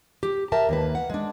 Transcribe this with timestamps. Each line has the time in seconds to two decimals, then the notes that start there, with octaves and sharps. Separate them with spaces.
0.23 G4
0.52 A#4 E5 G5 A5
0.69 D#2 A#3 B4
0.95 F#5
1.10 G#3 D4